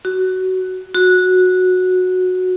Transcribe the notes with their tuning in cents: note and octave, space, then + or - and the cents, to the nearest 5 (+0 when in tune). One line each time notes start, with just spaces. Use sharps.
F#4 +15
F#4 -10